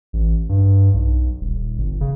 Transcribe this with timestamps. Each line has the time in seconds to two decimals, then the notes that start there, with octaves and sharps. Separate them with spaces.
0.13 A1
0.49 G2
0.94 B1
1.41 D#1
1.78 G1
2.01 C#3